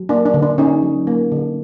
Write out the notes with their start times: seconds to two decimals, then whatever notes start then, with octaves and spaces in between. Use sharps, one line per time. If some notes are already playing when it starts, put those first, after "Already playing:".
Already playing: F#3
0.09 A#3 D4
0.26 D4
0.34 D3
0.43 D4
0.58 C#4 D#4
0.82 F#3
1.07 A#3
1.32 D3